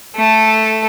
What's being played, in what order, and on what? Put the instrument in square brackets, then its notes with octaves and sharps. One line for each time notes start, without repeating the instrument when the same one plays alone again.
[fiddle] A3 A4